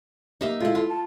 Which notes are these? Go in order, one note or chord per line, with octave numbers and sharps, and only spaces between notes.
A#3 D#4 G4 E5 F5
A#2 G#3 E4 F4 A4 F5
F4 A4 F5
A5